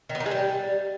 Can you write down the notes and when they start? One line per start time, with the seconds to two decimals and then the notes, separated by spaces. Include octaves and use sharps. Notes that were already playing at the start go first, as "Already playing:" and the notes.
0.09 D#3
0.15 B3
0.20 D#3
0.26 G#3
0.31 G3